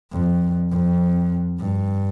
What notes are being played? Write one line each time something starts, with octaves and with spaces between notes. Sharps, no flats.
F2
F2
G2